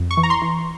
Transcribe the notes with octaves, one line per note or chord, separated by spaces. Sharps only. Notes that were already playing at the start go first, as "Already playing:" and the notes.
Already playing: F2
C#6
E3
A#5
C6
E3